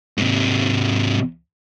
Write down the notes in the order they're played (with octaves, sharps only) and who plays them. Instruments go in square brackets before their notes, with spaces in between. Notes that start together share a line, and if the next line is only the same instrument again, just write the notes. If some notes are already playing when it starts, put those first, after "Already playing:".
[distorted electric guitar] G#2 C3